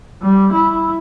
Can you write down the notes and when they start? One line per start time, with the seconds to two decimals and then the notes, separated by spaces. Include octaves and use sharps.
0.22 G3
0.52 E4